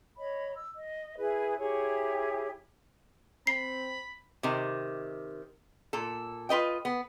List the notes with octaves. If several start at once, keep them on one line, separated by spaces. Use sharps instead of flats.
C#5 D#5 B5
E6
D#5
E4 G#4 B4
E4 G4 G#4 C#5
C4 B5 C7
C3 D#3
A#2 A4
F4 B4 D#5 G5
B3